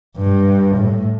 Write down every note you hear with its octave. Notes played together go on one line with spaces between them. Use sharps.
G2
A2